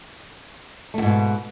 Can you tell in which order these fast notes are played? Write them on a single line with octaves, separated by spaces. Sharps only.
A3 E2 G#2 B2